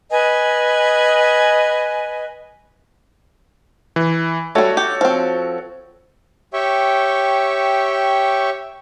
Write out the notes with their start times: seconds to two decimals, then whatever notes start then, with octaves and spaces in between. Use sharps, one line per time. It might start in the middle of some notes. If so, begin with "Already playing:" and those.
0.10 B4 D#5 G#5
3.96 E3
4.55 G3 A3 F#4 A4 C#5
4.77 G4
5.01 F3 C4
6.53 G4 C#5 E5 G5 C#6